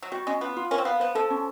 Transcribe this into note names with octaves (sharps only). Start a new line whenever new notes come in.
F#3
G3 F#4
G#3 C#4
B3 F4
F4
C#4 A#4
C4
B3 F5
B3 C5
F3 A4
C#4